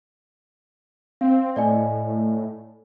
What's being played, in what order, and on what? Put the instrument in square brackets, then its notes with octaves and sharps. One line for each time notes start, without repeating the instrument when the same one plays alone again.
[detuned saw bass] C4 [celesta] F5
[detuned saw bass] A2 [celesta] D5 D#5 G#5